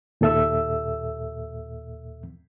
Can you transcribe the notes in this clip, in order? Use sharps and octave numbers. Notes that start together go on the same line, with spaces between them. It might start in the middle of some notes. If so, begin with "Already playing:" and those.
D#2 A#2 A4 E5 E6